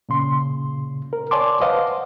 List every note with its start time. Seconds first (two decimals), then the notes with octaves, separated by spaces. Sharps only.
0.09 A#2 C#3 C6
1.13 A#4
1.31 C#5 D5 G#5 A5 C6 D6
1.60 B4 C5 D#5 F5 F#5